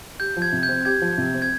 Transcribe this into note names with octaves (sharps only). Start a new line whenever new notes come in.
G4 G6
F3
G#6
C3
G6
C4
G4 G#6
F3
C3
C4
G#6